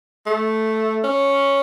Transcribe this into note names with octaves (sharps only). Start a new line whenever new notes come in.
A3
C#4